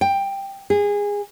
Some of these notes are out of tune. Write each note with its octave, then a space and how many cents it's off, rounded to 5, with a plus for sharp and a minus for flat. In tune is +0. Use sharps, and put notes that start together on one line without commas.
G5 +10
G#4 -20